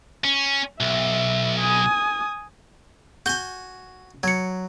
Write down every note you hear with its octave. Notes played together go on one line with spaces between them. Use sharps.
C#4
B1 E5
G#5 D#6
F#4 G#5 G6 G7
F#3 G#6 C#7